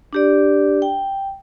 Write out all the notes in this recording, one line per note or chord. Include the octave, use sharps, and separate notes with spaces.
D4 G4 D5
G5